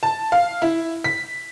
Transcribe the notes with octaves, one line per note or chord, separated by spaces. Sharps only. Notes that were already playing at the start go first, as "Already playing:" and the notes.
A5
F5
E4
B6